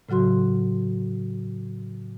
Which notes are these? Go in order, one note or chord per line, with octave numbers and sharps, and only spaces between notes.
A2 C#3 F#3 F#4 C6